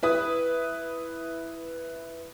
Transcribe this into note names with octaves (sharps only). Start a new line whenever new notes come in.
E4 B4 D#6